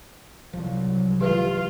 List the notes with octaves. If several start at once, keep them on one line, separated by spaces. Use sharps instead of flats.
C2 F3 F#3
E3 F3 G#3 F4 G4 B4